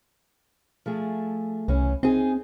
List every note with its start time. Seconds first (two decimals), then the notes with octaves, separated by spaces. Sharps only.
0.86 F3 A3 G#4
1.68 C2 E3 C#4
2.03 C4 D#4 G#4